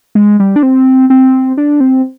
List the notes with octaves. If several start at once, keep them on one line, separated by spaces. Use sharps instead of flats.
G#3
G3
D4
C4
C4
D4
C4